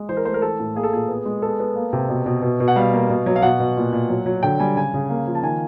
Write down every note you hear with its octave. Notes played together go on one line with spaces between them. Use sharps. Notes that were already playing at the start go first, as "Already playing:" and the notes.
Already playing: G#3
E3 C5
A#4
A3 C5
A#4
E3 A4
A2
A#3 G#4
A4
A#2 G#4
B3
G#3
B3 A4
B3
A#3
C3
B2
B2
B2
B2
F#5
G3 F5
A#3
B2
F#3
F5
B2 F#5
B2
A#2
A#2
F#3
F#3
D3 G5
G3 G#5
C#3 G#5
C#3
A#3
F3
A5
D#3 G#5